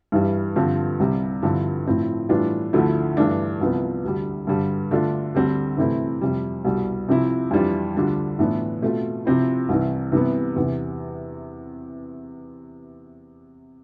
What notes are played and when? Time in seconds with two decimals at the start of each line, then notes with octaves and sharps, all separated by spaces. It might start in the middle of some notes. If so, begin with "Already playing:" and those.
0.12 G2 E3 G3
0.56 G2 D3 F3 C4
1.00 C2 C3 G3
1.42 G2 D3 F3 C4 E4
1.87 A2 F3 C4 E4
2.29 A2 E3 G3 D4 F4
2.73 D2 D3 F3 A3 E4
3.17 G2 E3 A3 D4
3.61 C2 C3 F3 B3
4.04 D2 D3 G3
4.47 G2 D3 G3
4.91 D3 A3 D4 F4
5.34 D2 D3 G3 C4
5.77 C3 E3 A3 C4 E4
6.21 F2 C3 G3
6.65 C2 B2 G3
7.09 C3 F3 C4 E4
7.51 F2 E3 G3 D4 F4
7.95 D2 D3 G3 D4 F4
8.39 A2 E3 B3 D4 F4
8.82 B2 A3 C4 F4
9.25 C3 F3 C4 E4
9.69 C2 C3 E3
10.12 C3 E3 G3 B3
10.56 E2 C3 E3